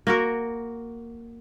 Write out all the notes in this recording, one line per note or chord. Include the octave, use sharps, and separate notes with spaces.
A#3 F#4 A#4